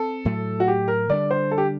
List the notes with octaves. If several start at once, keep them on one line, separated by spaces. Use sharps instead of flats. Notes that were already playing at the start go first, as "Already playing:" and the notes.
Already playing: C4 A4
A2 F#3 A3
F#4
G4
A#4
D3 G3 D4 D5
C5
A4
G4